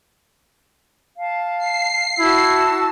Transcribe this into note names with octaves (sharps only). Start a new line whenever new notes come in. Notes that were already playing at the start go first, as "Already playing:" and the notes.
F5 A5
C7
E4 F#4 A5 E6